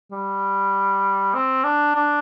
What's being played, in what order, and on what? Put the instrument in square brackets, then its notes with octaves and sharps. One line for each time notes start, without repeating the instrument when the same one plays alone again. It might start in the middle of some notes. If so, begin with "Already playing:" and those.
[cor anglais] G3
C4
D4
D4